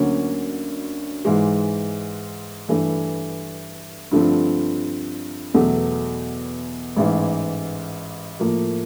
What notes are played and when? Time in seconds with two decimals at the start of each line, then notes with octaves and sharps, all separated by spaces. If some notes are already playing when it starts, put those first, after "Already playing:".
Already playing: D2 D3 F#3 A#3 C#4
1.25 G#2 E3 G#3
2.68 G2 E3 A3
4.11 G2 D3 F3 A3 C4
5.54 E2 B2 F#3 A3
6.96 A1 G#2 E3
8.40 A2 F3 A#3